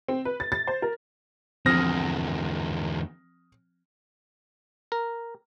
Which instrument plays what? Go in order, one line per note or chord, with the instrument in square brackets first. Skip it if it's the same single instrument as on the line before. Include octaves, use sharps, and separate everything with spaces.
[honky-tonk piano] C4
B4
A6
A6
C5
A#4
[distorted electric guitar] E2 D3 [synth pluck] F3 C4 [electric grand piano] D#6 F6 A#6
[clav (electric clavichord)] A#4